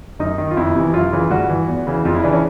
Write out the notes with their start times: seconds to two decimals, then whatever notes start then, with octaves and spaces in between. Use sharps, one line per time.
0.19 F#2 D#4
0.38 D#3
0.51 F4
0.57 F2 E4
0.75 C3 E3
0.94 F#2 F4
1.12 C#3 E3 F4
1.31 G2 F#4
1.49 E3
1.68 E2
1.87 C#3 E3
2.05 F2 F4
2.14 E4
2.23 C#3 E3 D4
2.33 C#4